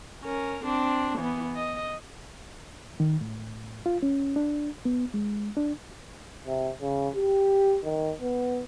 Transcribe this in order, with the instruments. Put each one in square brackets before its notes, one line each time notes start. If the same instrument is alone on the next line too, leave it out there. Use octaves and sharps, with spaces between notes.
[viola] C#4 A#4
C4 D4
E3 B3
D#5
[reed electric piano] D#3
A2
F4
C#4
D4
B3
G#3
D4
[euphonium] C3
C#3
G4
D#3
B3